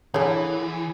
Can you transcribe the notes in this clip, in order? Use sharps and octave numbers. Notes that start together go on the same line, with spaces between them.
D3 E3 A#3 G#4 C#5 F#5